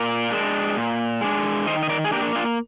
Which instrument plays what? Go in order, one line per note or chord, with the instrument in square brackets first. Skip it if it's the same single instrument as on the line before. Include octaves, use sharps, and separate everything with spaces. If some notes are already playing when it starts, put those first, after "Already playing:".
Already playing: [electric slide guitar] A#2 A#4 D5
G#3 D4
A#2
G#3 D4
D#3 C5 D#5
D#5
A#4 D5
G#4
A#3 D4 G4 A#4
D4 F4